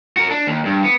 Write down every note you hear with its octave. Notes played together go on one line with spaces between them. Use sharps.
F#4 A#4
D4
D#2
G2
B3